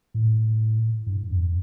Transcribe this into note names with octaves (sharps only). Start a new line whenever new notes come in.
A2
G2
F2